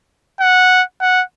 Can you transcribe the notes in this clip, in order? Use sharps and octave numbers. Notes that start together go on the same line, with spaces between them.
F#5
F#5